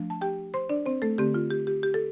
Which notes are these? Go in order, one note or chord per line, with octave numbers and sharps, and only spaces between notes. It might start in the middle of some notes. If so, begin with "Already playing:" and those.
Already playing: F3 A3 D4
A5
G4 G5
C5 C6
D4 D5
C4 C5
A3 A4
D3 A3 C4 G4
F4
G4
G4
G4
A4